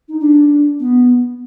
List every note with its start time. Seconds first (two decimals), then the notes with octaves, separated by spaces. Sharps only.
0.08 D#4
0.20 D4
0.80 B3